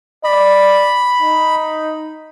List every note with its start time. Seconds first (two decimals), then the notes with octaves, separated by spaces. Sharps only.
0.24 D5 B5
1.22 D#4